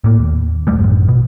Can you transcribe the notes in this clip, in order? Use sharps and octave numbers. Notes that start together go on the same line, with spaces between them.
A2 A#3
D#2
E1 G3 A3
A1 F#2 A2
B2